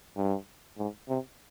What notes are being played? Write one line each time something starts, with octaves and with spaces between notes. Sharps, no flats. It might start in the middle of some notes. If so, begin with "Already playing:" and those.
G2
G#2
C3